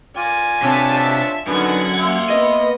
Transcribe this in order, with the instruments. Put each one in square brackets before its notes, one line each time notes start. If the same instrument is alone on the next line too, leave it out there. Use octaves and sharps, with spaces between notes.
[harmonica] F4 D5 [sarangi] G#5
[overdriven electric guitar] C3 [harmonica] D4 F4 C#5 [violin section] A5 B6
[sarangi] E5
[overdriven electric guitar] F#2 [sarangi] D3 [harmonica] D#3 B3 [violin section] F#5 G#6
[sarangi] A#3 [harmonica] E5 C6
[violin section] B3 [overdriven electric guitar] D#5